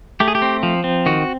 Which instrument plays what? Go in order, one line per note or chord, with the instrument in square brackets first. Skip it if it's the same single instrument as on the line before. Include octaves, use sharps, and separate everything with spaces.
[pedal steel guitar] A3 G4
G#4
G4
C4
F3
C4
D#3 F#4